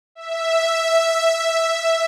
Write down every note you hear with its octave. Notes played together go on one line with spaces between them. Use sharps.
E5